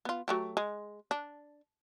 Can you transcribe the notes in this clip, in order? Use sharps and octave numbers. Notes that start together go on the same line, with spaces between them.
B3 F4
F#3 A3 G4
G#3
D4